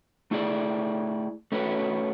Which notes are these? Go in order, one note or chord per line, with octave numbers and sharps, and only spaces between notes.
A3 E4 G#4 D5
A3 C#4 F#4 B4